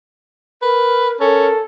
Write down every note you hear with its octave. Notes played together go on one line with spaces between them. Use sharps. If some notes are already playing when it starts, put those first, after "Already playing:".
A#4 B4
C#4 A4 A#4